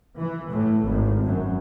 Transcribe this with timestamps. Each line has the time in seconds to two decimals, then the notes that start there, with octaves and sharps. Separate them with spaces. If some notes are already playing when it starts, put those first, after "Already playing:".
0.18 E3
0.49 A2
0.85 G#1
1.25 F#2